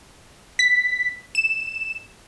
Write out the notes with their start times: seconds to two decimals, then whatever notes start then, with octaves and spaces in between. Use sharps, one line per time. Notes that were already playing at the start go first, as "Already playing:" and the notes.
0.59 B6
1.35 E7